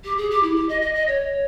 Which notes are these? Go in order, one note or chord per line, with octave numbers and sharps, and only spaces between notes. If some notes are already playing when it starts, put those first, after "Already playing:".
G4
G#4
G4
E4
G4
D#5
D#5
D#5
C#5